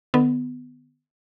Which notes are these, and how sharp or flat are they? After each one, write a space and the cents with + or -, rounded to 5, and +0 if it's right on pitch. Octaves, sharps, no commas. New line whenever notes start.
D3 +45 B3 +15